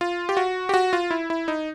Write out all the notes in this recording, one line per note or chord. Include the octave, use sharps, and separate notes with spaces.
F4
G4
F#4
G4
F#4
F4
E4
E4
D#4